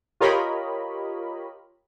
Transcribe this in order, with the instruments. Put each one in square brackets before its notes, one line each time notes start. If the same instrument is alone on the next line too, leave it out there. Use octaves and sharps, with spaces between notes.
[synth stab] F4 G4 A#4 C#5 D#5 B5